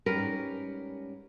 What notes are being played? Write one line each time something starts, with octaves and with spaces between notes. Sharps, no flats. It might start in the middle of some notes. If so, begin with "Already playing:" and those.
G#2 G3 C#4 A#4 B4